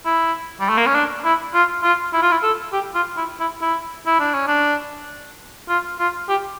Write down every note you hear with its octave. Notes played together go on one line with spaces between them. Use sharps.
E4
G3
A3
A#3
C#4
D4
E4
F4
F4
E4
F4
E4
A4
G4
F4
E4
E4
E4
E4
D4
C#4
D4
F4
F4
G4